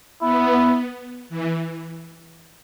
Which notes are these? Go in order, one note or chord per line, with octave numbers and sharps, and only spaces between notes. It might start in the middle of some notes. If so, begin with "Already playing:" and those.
B3 E4
E3